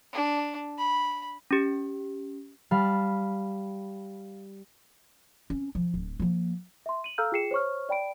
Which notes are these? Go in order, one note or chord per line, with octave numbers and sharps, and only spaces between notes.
D4
B5
C#4 G4
G3 F5 A5 B5
C4 C#4
F3
D1
F3 A#3
E5 C6
D#7 F#7
A4 F5 A#5 E6 F6 G6
F4 G#4 G5 C7 C#7 E7
C5 C#5 C#6 F6
D5 G5 B5 D7